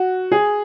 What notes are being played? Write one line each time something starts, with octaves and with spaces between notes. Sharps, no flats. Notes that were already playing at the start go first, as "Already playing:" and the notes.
Already playing: F#4
G#4